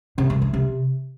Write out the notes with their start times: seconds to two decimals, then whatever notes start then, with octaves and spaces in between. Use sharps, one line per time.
0.18 C3
0.30 G2
0.42 E3
0.54 C3